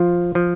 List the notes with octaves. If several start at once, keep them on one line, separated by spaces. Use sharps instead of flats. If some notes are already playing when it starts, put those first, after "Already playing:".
Already playing: F3 F4
F3